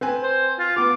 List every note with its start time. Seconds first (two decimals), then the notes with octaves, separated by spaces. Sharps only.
0.01 C4 B4 G#5
0.23 C5
0.59 F4
0.76 B3 F4 D6